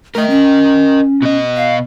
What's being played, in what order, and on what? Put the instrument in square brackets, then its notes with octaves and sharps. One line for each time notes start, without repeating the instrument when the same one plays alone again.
[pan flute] A3 [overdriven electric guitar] A#4 D#5
[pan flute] C#4
[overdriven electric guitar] B2 D#5
[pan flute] F5